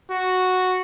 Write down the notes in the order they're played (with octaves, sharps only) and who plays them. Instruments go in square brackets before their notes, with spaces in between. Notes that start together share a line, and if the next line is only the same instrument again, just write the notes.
[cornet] F#4